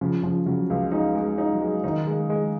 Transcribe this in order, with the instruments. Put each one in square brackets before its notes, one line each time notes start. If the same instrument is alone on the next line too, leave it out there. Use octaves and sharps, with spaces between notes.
[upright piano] C#3 [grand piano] F3
[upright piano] C#3 [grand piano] F3
[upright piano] C#3 [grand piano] F#3
[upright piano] C#2 [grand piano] G#3
[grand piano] G#3 [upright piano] D#4
[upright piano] G#3
D#4
[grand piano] F#3
[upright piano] G#3
[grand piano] D#3 [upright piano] D#4
[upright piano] G#3
G#3